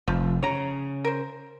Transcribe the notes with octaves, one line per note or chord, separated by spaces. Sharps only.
F1 F3
C#3 C#5 A#5
A#4 C5